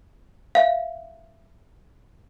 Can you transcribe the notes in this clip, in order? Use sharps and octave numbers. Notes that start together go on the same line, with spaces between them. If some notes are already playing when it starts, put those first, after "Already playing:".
E5 F5